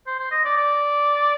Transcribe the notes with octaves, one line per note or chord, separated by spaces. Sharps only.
C5
C5
D#5
D5
D5